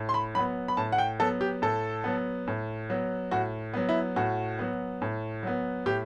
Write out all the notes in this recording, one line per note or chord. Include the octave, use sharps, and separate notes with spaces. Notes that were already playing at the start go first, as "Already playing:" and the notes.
Already playing: A2
C6
B5
F#3 B3 B5
B5
A2 A5
F#5
G5
F#3 B3 A4
G4
A2 A4
F#3 B3
A2
F#3 B3
A2 F#4
F#3 B3
E4
A2 F#4
F#3 B3
A2
F#3 B3
A2 G4